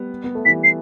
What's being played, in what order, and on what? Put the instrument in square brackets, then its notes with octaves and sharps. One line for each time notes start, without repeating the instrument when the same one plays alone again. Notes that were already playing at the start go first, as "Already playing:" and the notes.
Already playing: [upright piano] G3 B3
B3
A3
[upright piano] E3 G3 [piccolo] B6
[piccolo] C7